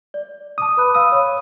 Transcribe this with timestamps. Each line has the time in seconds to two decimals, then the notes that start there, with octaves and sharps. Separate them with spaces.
0.14 D5
0.58 A5 D6 D#6
0.77 B4 B5 F#6
0.94 F5 B5 D#6 E6
1.12 C#5